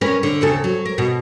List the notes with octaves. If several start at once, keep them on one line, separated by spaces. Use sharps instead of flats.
C#4 A#4 B4
D3
D#2 C#3 A4
F#3
A#4
B2